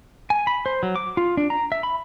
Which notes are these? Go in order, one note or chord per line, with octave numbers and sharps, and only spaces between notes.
G#5
B5
C5
F#3
D6
F4
D4
A#5
E5
B5